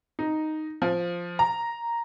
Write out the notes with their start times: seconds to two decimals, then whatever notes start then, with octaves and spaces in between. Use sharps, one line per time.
0.19 D#4
0.82 F3
1.39 A#5